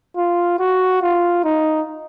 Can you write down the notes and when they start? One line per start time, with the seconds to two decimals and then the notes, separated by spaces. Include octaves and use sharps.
0.17 F4
0.59 F#4
1.02 F4
1.44 D#4